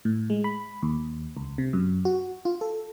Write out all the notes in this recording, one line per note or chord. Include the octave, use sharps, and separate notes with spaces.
A2
G#3
B5
D#2
C#2
C3
F#2
F#4
F4
A4